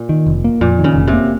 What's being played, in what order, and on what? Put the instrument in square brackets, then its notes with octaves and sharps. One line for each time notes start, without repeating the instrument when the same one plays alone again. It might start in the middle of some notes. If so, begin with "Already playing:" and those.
Already playing: [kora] A#2
[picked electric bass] D#3
F1
A#3
[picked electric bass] F2 [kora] A#2
[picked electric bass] D#3
[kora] C#3
[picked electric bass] F1
[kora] C3
[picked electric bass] A#3